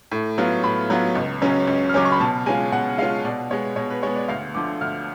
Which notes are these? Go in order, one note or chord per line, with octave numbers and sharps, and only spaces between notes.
A2
F#3 B3 F4
A2 B5
F#3 B3 F4
C#2
C#3 F#3 C#4
C#2
F6
C#3 F#3 C#4 D6
C#6
B5
B2 A5
G#3 C#4 F4 G#5
B2 F#5
G#3 C#4 F4 F5
B2 D5
G#3 B3 C#5
B2 C#5
B4
G#3 B3 C#5
D5
D2 F5
D3 F3 D6
D2 F6